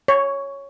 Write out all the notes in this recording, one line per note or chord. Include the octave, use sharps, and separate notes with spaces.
C#5